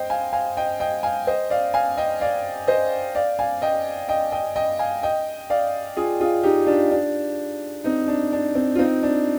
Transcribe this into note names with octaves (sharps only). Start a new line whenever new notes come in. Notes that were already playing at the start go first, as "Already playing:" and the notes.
Already playing: C5 D#5 G5
F5 G#5
F5 G#5
D#5 G5
D#5 G5
F5 G#5
C5 D#5
D5 F5
F5 G#5
D#5 G5
D5 F5
C5 D#5
D5 F5
F5 G#5
D#5 G5
D#5 G5
D#5 G5
D#5 G5
F5 G#5
D#5 G5
D5 F5
F4 G#4
F4 G#4
D#4 G4
D4 F4
D4
C4 D#4
D4
D4
C4
F4
C4 D#4
D4